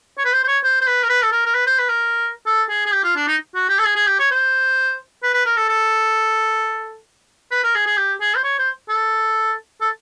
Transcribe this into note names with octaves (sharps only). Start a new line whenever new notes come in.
C#5
B4
C5
C5
C#5
C5
C5
B4
A#4
B4
A4
A#4
A#4
B4
C5
B4
A#4
A4
G#4
G#4
G4
F4
D4
D#4
F#4
G4
A4
G#4
G#4
G4
C#5
C5
B4
B4
A#4
A4
A4
B4
A#4
G#4
G#4
G4
G#4
C5
C#5
C5
A4
A4